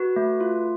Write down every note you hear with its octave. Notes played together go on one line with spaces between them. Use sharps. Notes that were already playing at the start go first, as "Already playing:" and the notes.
Already playing: F#4 B4
A3
F4